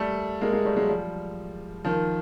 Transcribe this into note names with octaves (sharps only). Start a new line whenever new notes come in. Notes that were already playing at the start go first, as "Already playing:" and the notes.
Already playing: G3 A3
G#3 A#3
G#3 A#3
G3 A3
F#3 G#3
F3 G3
D#3 F3